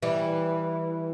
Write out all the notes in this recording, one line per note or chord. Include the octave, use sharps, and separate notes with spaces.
E3 G3